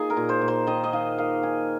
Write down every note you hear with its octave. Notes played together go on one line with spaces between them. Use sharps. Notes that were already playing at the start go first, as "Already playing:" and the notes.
Already playing: A#3 D#4 F4 G#4
A#4
A#2
C5
A#2
C5
D#3 D#5
D#5
D#3 F5
A#3 F5
D#4 G#5